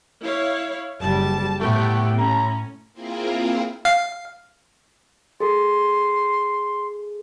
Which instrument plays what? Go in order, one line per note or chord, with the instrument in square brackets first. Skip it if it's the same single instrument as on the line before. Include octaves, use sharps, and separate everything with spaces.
[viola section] E4 C#5 F5
[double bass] F#1 G3 [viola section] A5
[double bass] A2 [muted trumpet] A3 [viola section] B3 G4 G5
[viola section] C#4 [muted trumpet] A#5
[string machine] A#3 C4 E4 F4 G#4 A#4
[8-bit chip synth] F5
[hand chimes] G#4 A4 [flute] C6